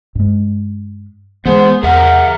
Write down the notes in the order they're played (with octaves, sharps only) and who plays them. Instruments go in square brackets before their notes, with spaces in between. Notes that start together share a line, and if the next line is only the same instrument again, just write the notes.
[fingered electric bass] G2 G#3
[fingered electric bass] E3 G#3 [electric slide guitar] B3 F#5 [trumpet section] G#4 C5
[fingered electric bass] E2 [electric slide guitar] G#4 E5 A#5 [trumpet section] A#4 [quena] F#5